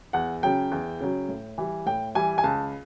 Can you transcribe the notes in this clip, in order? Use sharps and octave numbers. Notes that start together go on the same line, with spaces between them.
E2 F#5
C#3 F#3 G5
E2
C#3 F#3
A2
E3 G3
A2 G5
E3 G3 G#5
G#5
C#2 A5